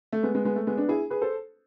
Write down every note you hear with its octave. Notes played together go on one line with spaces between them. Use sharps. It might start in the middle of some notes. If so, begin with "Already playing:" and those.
A3
G#3 B3
G#3 B3
G#3 B3
A3
G#3 B3
B3 D4
E4 G#4
G#4 B4
A4 C5